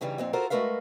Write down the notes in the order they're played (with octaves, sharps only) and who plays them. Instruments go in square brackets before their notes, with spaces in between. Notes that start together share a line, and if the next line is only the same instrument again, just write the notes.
[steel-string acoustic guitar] G2 C#3 E3 G3 D#4
F2 A#2 C4
F4 F#4 A4 A#4 C5
G#3 A3 F#4 A#4 B4 F5